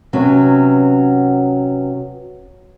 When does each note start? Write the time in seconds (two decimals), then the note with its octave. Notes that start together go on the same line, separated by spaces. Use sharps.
0.13 C3 F#3 B3 C#4